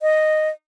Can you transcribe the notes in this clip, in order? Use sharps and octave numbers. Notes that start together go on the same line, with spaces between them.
D#5